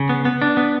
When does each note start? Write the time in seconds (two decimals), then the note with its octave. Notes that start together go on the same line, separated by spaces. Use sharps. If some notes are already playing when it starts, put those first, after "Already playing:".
Already playing: C#3
0.09 B3
0.25 B3
0.42 D4
0.57 B3